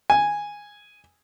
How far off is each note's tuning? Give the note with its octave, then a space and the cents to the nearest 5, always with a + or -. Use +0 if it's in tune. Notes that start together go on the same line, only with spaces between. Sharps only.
G#5 -10